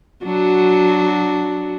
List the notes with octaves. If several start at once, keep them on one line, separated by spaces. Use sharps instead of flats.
F#3 D4 F#4